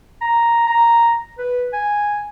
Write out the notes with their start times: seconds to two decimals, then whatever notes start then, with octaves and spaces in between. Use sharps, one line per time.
0.21 A#5
0.67 A#5
1.39 B4
1.73 G#5